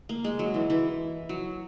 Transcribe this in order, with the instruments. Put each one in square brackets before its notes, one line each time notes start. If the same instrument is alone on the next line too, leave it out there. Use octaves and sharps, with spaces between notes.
[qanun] A#3
G#3
F#3
E3
E3
F#3